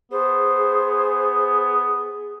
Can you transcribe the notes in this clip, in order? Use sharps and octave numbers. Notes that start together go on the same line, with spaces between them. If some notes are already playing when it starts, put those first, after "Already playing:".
B3 G#4 C5